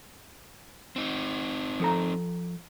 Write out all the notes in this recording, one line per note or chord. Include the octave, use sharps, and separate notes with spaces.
C4 D#4
F3 A4 A#5